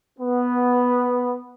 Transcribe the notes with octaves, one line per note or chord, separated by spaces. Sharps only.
B3